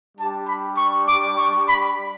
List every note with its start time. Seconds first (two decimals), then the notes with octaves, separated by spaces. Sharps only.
0.18 G3 D4 G4 A5
0.48 B5
0.77 C#6
1.07 D6
1.37 C#6
1.66 B5